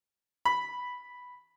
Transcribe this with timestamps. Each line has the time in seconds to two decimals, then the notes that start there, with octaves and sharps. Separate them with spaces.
0.45 B5